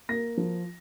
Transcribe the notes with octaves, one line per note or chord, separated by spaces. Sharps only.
A#3 A#6
F3